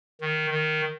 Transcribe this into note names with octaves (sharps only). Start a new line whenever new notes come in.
D#3
D#3